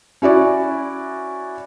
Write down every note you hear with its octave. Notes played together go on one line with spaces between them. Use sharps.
C#4 E4 F#4 D5